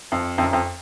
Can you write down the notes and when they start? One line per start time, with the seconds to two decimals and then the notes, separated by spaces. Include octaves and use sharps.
0.12 F2
0.38 F2
0.43 F#2
0.53 F2